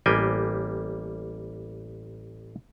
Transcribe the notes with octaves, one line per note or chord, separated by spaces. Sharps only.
A1 G3 A#3 B3 G5 G#5